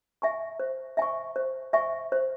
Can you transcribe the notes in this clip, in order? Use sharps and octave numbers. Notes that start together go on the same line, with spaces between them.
E5 G#5 C#6
C5
E5 G#5 C#6
C5
E5 G#5 C#6
C5